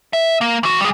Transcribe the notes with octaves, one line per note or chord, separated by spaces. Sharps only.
E5
A#3
E3 F#4
G3 G#4